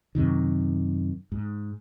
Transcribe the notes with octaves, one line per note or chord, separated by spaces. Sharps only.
F#2 C3 D#3
G#2